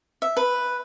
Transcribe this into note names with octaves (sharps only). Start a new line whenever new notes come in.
E5
B4